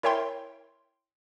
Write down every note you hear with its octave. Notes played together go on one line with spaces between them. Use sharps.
E4 A#4 C#5 E5 G5 C6